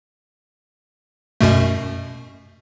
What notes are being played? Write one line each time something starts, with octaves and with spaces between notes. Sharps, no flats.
F#2 B2 A3